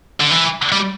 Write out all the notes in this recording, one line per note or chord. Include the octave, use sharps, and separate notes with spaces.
D3
E3
G3